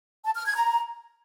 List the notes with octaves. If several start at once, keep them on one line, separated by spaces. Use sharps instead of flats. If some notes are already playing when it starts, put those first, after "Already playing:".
A5
F6
G#6
A#5